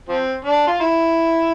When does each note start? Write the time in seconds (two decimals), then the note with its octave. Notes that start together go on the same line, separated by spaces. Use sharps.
0.09 F3 C4
0.45 D4
0.67 F4
0.80 E4